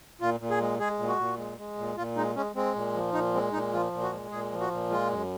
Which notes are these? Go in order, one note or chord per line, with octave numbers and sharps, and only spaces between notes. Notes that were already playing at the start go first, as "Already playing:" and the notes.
A#2 F4
A#2
G#4
G#3
G#3 G#4
A#2
F#4
A#2
G#3
G#3
A#2
A#2 F4
G#3 D#4
G#3 C#4
G#3 C4
A#2
F3
A#2 D#4
G#3 C4
A#2 D#4
F3 F4
A#2
F#4
G#3
A#2 G#4
F3
F#4
A#2
G#3 F4
F#2